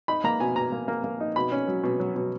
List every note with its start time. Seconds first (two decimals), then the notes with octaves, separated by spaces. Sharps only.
0.08 D#4 B5
0.24 A#3 A#5
0.40 B2 G#5
0.56 B2 A#5
0.72 A#3
0.88 A#3
1.04 A#3
1.20 D#4
1.36 B2 B5
1.52 C#4
1.68 F#3
1.84 B2
2.00 F#3
2.16 B2